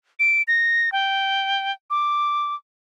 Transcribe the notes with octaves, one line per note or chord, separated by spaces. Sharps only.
D7
A#6
G5
D6